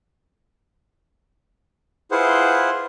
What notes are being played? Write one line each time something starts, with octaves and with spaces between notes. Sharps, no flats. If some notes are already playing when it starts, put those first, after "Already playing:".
E4 F4 G#4 B4 C5 F#5